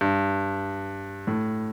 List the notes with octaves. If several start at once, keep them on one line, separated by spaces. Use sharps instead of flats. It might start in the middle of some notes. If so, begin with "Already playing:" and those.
G2
A2